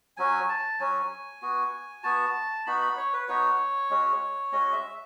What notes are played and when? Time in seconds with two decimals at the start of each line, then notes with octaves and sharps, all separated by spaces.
0.17 F#3 C#4 F#4 G#5
0.49 A5
0.79 F#3 C#4 F#4 G#5
1.42 B3 F#4
2.03 B3 F#4 A5
2.66 B3 D#4 F#4 B5
2.81 B5
2.97 C#5
3.13 B4
3.28 B3 D#4 F#4 C#5
3.90 G#3 C#4 F#4
4.52 G#3 C#4 F#4 D#5
4.73 E5